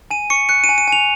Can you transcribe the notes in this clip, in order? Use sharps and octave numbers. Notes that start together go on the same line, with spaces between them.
G#5 D#7
C#6 C#7
F#6 C#7
D#7
G#5
D#7
G#5 F7